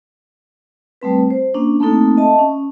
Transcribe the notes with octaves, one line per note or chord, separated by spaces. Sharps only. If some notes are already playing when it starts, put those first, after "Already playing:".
G3 A3 C4 B4
C5
A#3 C#4 D4
A3 A#3 C4 D#4 A4
D#5 E5 A5
C#4